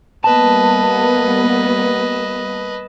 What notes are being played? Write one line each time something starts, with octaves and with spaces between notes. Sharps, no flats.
G3 A#3 B3 B4 D#5 A5